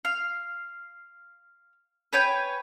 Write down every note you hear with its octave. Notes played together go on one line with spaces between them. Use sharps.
F5
B4 C#5 G5 G#5